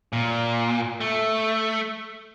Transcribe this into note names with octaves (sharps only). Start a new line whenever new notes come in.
A#2
A3